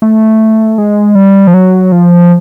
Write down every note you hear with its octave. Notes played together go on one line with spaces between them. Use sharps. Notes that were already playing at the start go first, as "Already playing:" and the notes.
A3
G#3
G3
F3
F#3
F3